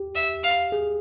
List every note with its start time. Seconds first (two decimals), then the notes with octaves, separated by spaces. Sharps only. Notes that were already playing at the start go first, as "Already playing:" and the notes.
Already playing: G4
0.15 E5
0.44 F5
0.72 G#4